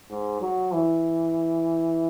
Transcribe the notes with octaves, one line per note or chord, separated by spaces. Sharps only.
G#2
F#3
E3